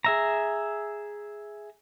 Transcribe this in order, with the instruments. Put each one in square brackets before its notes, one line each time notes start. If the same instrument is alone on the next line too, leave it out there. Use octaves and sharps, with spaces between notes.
[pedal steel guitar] G#4 E5 A#5